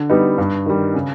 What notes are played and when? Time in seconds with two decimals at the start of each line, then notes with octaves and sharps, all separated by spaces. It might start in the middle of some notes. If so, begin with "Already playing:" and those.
Already playing: D3
0.09 G3 B3 D#4
0.38 G2
0.66 D#3 G3
0.94 C#3